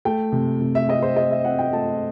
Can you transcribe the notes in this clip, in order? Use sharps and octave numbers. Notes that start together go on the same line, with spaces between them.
A3 G5
C3
C3
E5
C4 D#5
C5
C4 D#5
E5
C4 F#5
G5
A3 A5